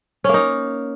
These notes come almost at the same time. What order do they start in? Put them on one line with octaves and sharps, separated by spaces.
C#4 A#3 D#4